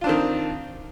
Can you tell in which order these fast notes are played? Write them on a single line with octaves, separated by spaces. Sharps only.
F4 D4 C4 D#3